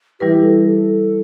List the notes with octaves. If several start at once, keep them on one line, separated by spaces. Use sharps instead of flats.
E3 G3 E4 G4 B4
A4
A4